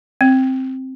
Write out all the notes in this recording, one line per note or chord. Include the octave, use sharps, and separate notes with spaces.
C4